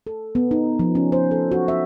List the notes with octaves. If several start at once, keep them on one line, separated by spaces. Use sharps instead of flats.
A4
B3
D#4
F3
C#4
C5
A4
F#4
E5